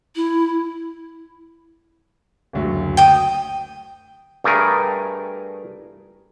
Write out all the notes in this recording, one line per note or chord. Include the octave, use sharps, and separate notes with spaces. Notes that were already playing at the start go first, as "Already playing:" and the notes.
E4
F#1 D2 F#3
G5 D#6
G2 A3 G#4 A#4